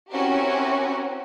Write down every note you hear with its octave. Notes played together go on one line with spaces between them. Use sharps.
C4 C#4 E4 F#4 G4 A#4